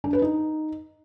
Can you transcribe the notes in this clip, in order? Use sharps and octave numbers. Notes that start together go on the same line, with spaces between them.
D4
B4
D#4